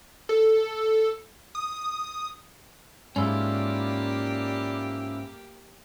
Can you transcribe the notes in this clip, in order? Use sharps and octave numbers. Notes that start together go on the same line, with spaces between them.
A4
D#6
G#2 A#3 C#4 E4 F4 G4 D5